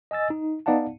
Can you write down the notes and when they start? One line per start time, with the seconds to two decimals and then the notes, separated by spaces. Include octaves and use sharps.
0.11 D#5 G#5 E6 A6
0.30 D#4
0.66 B3 D#4 D5 F5 F#5 A5